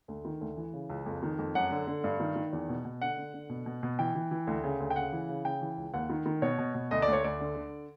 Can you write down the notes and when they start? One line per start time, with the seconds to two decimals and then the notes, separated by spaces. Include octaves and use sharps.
0.08 D2
0.25 D#3
0.41 D2
0.57 E3
0.73 C#3
0.90 C#2
1.06 F2
1.23 D#3
1.39 F2
1.55 F#2 F#5
1.71 D3
1.87 D3
2.04 G2
2.20 D#3
2.36 D#3
2.53 E2
2.69 B2
2.85 B2
3.01 D3 F#5
3.17 D3
3.34 D3
3.50 B2
3.66 B2
3.83 B2
3.99 E3 G5
4.15 E3
4.31 E3
4.47 D2
4.64 C#3
4.80 D2
4.90 G5
4.96 C#3 F#5
5.12 E3
5.29 C#3
5.45 C#3 G5
5.61 E3
5.78 C#2
5.94 D#2 F#5
6.10 D#3
6.26 D#3
6.42 B2 C#5
6.59 B2
6.75 B2
6.91 D2 D#5
7.02 D2 D5
7.13 C#5
7.24 D2 D5
7.40 D3
7.56 D3